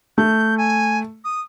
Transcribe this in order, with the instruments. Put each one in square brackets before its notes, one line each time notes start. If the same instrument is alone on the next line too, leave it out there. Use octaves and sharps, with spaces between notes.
[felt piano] A3 [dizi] G6
[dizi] G#5
D#6